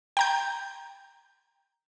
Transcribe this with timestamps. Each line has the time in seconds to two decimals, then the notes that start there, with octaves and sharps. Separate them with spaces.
0.17 G5 A#5 G6